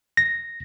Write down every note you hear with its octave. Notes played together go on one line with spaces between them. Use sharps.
A#6